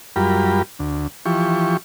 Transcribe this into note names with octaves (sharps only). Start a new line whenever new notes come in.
F#2 G3 F4 G4 A#4 B5
D2
E3 F3 G4 C#6